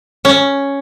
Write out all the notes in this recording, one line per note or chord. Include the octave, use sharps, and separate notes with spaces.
C#4